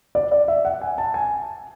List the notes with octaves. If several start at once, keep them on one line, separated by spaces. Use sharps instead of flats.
D5
D5
E5
F#5
G#5
A5
G#5